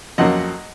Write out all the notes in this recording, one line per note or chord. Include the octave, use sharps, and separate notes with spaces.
F2 C#3 F#3 A#3 D#5 F#5